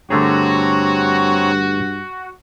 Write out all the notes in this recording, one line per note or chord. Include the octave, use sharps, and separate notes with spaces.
G2 D3 A3 C4 F#4 G#4 C#5 A#5